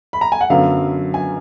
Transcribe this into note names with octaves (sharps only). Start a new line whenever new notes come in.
B5
A#5
G#5
F#5
F#2 D3 F#3 B3 F5
G#5